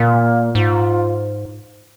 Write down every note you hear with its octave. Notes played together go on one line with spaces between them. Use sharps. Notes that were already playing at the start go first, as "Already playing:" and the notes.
Already playing: A#2 A#3
G#2 F4